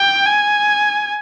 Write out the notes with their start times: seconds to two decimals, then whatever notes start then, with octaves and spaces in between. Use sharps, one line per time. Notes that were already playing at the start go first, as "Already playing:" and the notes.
Already playing: G5
0.26 G#5